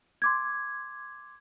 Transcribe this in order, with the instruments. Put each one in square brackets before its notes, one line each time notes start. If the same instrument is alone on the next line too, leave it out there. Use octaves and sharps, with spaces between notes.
[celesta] C6 D6 G#6